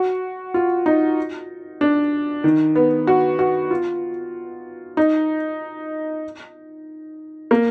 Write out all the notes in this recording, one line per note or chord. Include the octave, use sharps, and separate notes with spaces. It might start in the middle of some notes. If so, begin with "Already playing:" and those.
Already playing: F#4
F4
D#4
D4
D#3
B3
F#4
F#4
F4
D#4
A#3